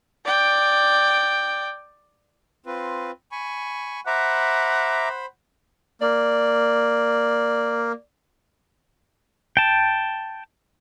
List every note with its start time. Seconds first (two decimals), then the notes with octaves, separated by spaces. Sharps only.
0.25 D5 G5
2.66 C4 F4 B4
3.32 G#5 B5 C#6
4.07 C5 E5 F#5 A#5 B5 D6
6.01 A#3 D5
9.57 G5 A5